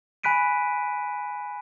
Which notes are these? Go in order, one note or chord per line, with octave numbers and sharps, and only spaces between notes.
G#5 B5 F#6 B6 D7 D#7